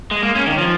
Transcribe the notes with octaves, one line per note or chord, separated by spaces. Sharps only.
G#3
A#3
C#4
D#3
F3